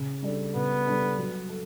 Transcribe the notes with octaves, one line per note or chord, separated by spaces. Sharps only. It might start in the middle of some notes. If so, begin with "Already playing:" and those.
Already playing: C#3
G3 D4 A4
C#3 B3
G3 D4 A4
F#3
A4